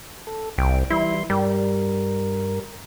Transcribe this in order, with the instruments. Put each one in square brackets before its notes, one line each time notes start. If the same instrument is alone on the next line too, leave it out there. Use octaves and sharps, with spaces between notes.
[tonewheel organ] A4
[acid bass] C2 [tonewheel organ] G5
[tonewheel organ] E3 G3 C6 [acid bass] E4
[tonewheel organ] G2 A#4 [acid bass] G3